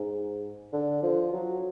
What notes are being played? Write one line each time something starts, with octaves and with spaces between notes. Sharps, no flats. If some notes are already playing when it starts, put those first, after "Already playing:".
Already playing: G#2
D3
F3
F#3